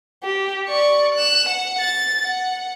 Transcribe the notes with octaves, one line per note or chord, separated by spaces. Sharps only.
G4
D5 C#6
F#6 E7
F#5
A6
F#5